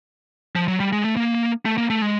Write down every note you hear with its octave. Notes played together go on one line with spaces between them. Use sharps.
F3
F#3
G3
G#3
A3
A#3
A3
A#3
A3
G#3